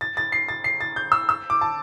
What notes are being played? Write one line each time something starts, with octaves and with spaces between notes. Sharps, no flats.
A6
A6
C7
A6
C7
A6
G6
E6
E6
D6
A5